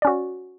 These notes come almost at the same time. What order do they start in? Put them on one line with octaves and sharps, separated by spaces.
D5 C#4 F#4